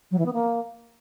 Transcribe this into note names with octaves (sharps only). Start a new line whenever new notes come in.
F#3
E3
B3
A#3